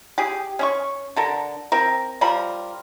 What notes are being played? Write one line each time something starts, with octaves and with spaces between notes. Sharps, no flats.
G4 G#4
C#4 D5 C#6
D3 A4 A#4
C4 A#4
F3 G3 A#4 B5